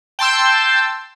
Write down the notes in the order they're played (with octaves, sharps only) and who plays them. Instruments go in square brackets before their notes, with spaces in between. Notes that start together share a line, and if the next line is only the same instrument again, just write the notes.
[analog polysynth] G5 A5 C6 E6